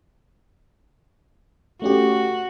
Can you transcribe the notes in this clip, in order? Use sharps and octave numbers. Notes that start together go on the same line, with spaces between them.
A3 C#4 F#4 G4